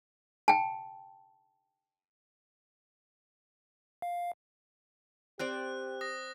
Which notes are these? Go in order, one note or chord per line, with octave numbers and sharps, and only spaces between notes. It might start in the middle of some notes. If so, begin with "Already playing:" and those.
G5 A5
F5
C4 G4 C5 D5 F#6
D#6 A#6